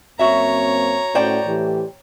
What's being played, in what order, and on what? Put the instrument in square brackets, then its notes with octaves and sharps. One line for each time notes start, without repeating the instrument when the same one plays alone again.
[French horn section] F#2 A#3 C4 [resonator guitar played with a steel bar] F#4 E5 [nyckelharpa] C#5 A#5
[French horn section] A2 C#4 F#4 [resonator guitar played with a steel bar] C5 D5 G5
[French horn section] A2 E3 G4